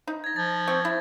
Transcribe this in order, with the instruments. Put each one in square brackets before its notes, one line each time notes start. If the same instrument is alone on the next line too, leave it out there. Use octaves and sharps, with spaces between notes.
[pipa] D#4
[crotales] G#6 A#6
[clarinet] F3 [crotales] A6
[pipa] C4 C#6
E4